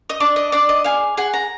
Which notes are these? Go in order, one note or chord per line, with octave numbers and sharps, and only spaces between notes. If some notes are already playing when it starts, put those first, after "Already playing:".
D#5
D4 D5
D#5
D4 D5
D#5
G#4 F5
G#4 F#5
A#5